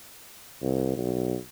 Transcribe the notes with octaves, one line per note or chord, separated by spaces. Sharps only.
C2
B1